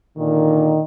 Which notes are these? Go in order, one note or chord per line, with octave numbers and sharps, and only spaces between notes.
A#2 D3 D#3